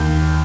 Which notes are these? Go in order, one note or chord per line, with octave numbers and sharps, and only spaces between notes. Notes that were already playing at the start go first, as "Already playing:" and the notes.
Already playing: D#2 G6